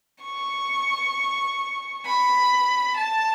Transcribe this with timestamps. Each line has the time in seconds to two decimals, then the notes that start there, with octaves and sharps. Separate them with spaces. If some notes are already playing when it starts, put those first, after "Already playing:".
0.23 C#6
2.06 B5
2.97 A5